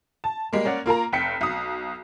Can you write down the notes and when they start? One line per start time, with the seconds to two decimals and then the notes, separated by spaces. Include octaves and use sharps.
0.24 A5
0.53 G3 G#3 A#3
0.65 A#3 C#4 D5 F#5
0.86 A#3 F4 A#4 A#5
1.13 F1 G5 B6 C#7
1.41 B1 D#6